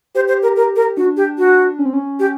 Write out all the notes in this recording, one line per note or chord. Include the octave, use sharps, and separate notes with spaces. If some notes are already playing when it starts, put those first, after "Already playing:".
G4 C5
C5
A#4
A#4
A#4
D4 F#4
G4
F#4
C#4
C4
C#4
G4